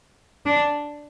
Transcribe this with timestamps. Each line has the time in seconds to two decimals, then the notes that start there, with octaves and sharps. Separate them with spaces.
0.46 D4